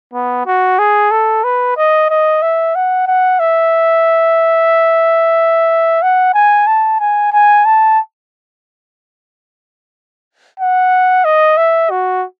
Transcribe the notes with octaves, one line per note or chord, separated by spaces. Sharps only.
B3
F#4
G#4
A4
B4
D#5
D#5
E5
F#5
F#5
E5
F#5
G#5
A5
G#5
G#5
A5
F#5
D#5
E5
F#4